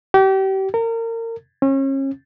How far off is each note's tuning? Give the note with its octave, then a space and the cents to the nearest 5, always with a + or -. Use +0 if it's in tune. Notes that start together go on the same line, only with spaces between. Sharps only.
G4 -35
A#4 -30
C#4 -35